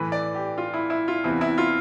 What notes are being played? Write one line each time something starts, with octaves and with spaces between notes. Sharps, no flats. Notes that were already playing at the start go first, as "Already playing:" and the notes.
Already playing: A2 E3 B4
D5
G4
F4
E4
E4
F4
E2 C3 E3 E4
E4
F4